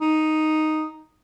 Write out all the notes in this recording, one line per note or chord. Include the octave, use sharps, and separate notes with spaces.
D#4